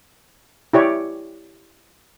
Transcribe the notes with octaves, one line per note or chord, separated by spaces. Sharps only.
E4 G4 C#5 D5